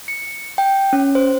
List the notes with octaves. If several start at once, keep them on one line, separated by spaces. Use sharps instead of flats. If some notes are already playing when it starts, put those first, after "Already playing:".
C#7
G5
C#4
C5